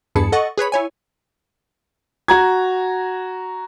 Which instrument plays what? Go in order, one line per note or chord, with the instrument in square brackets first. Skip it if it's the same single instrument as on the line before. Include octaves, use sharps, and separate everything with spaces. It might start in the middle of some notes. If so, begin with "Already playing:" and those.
[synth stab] E2 G2 G#4 A5 B5 C#7
A4 D#5 F#5 C#6 A6
G#4 B4 C#5 B5
E4 C#5 G#5
[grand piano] F#4 A#5 G#6